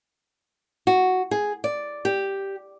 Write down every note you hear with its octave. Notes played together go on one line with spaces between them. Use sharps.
F#4
G#4
D5
G4